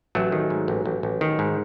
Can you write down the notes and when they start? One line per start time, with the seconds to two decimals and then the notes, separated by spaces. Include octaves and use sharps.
0.15 A1 F#3 A3
0.32 D#3
0.50 G#2
0.68 A1
0.86 A1
1.03 A1
1.21 D#3
1.39 G#2